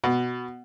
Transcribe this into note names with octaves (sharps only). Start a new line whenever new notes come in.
B2